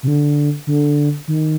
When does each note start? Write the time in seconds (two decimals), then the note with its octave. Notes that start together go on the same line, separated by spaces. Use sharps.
0.03 C3
0.08 D3
0.67 D3
1.28 D#3